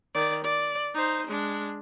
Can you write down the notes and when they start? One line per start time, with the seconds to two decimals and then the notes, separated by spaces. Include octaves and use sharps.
0.15 D#3 D5
0.44 D5
0.94 D#4 C5
1.27 G#3 D4